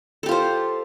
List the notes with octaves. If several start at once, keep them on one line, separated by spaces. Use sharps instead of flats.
F4 G4 A4 C5